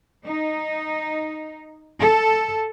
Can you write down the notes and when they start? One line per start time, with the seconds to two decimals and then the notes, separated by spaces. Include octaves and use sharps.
0.24 D#4
2.00 A4